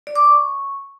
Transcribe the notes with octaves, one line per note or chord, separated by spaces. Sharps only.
D5
D6
C#6